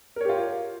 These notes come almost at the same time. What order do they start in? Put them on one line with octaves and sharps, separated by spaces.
A#4 C#5 G4 F4